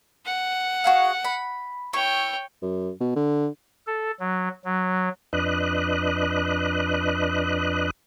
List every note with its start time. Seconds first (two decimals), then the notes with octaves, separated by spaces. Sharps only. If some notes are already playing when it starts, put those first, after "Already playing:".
0.25 F#5
0.84 F#4 G#4 F5
1.24 B5
1.93 E4 C#5 G5 C#6
2.62 F#2
3.01 B2
3.16 D3
3.87 A4
4.20 F#3
4.64 F#3
5.33 F2 D4 B4 D#5 F#6